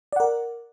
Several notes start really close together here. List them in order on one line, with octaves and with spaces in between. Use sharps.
D5 F#5 A#4